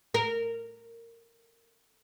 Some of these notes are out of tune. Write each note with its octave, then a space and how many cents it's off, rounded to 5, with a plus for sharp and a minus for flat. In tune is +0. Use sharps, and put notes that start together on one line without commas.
A#4 -15